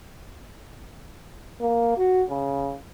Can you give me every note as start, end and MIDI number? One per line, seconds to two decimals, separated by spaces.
1.61 1.94 58
1.97 2.22 66
2.30 2.75 49